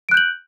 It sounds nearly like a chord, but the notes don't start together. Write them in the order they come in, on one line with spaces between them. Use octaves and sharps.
D7 F#6 G6 F#7